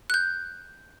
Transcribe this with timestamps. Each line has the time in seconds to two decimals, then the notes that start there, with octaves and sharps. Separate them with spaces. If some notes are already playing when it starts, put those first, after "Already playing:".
0.10 F#6 G6